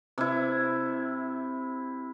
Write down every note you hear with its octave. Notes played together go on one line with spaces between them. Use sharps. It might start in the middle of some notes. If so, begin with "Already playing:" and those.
C3 E4